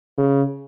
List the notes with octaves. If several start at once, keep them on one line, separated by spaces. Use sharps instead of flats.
C#3